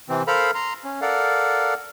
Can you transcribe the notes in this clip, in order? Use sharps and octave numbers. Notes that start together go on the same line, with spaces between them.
C3 E3 C4
A4 A#4 C5 F5 A#5 B5
A#5 C6
C#4
A4 A#4 D5 F5 F#5